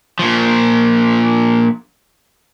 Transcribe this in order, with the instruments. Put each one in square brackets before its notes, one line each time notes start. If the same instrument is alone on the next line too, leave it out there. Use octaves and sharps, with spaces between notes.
[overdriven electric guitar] A#2 F3